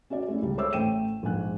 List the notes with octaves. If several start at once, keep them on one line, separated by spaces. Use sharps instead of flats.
C#4 F#4 C#5 D5
G#3 A3 C#4 E4
C#2 G3
G#4 C5 C#5 E5 D6 E6
A1 A3 G5 D#7 E7
A#1 G#2 G#5 F#6